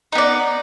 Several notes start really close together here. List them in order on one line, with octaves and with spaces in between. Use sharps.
D#4 B3 D5